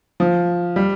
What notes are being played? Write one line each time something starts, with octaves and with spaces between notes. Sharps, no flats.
F3
G3